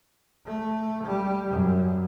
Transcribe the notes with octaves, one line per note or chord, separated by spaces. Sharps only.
A3
G3
F#2